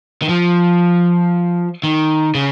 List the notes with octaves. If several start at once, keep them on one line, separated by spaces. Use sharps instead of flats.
D#3
F3
D#3
C#3